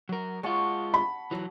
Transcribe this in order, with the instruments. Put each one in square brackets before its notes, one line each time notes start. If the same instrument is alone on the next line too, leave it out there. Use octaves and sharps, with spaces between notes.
[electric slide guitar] F#3 A#4
[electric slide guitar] G#3 F4 [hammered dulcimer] F#5 A5 C#6
[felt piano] B5
[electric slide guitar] E3 F#3